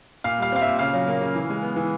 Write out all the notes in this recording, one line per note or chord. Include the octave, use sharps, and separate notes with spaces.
A#2 F5
G3 F5
C4 F5
A#2 E5
C#3 F5
F#3
A#3
C#3
E3
G#3
B3
E3